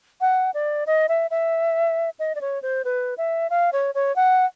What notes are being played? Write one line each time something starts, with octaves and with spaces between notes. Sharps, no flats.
F#5
D5
D#5
E5
E5
D#5
D5
C#5
C5
B4
E5
F5
C#5
C#5
F#5